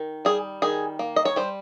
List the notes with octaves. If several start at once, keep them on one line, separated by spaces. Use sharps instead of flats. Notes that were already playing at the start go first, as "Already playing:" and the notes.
Already playing: D#3
G3 G#4
D#3 G#4
A#3
D#5
C#5
G3 C5